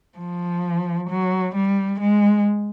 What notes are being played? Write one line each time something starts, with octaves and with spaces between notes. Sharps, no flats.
F3
F#3
G3
G#3